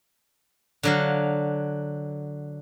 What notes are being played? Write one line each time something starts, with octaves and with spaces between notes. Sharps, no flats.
D3 F#3 F5